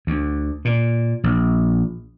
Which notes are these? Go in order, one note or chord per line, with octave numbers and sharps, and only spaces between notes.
D2
A#2
A#1